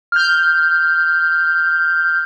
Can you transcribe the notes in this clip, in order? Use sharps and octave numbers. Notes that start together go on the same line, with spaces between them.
F6 G6